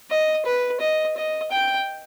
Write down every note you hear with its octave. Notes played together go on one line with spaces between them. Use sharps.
D#5
B4
D#5
D#5
G5